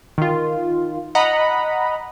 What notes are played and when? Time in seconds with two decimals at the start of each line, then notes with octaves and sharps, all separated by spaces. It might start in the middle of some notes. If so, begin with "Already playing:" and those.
0.18 D#3 F4
1.15 D#5 F#5 A#5 B5